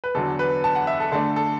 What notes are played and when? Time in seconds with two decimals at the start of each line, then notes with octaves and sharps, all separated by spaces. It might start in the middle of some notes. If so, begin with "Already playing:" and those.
0.04 B4
0.14 E2 D3 F#3 A4
0.39 B4
0.64 A5
0.75 F#5
0.87 E5
1.00 A4
1.12 D3 A3 D4 A4
1.36 A4